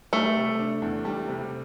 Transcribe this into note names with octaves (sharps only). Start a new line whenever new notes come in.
G3 A3
C3
D4
E2
G3
C3